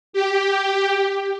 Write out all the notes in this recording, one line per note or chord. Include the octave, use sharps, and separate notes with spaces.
G4